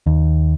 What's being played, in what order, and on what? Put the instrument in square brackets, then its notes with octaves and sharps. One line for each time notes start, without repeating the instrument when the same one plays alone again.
[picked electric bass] D#2